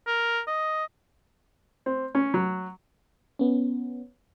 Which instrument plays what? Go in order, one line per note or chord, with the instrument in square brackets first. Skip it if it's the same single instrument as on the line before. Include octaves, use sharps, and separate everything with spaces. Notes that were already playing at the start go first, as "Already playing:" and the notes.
[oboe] A#4
D#5
[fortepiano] C4
C#4
F#3
[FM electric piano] B3 C#4